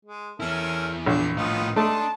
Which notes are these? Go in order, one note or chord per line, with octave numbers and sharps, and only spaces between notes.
G#3
E2 C#4 E4 A4 A#4
A#1 D4
A2 F3 B3 D#4 F4
A3 D4 D#4 D#5 A5 C6